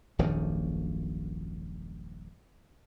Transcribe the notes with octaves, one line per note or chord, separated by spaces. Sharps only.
D#1 A#1 F#2 D#3